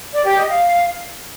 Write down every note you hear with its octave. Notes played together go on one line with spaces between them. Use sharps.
D5
G4
D#5
F5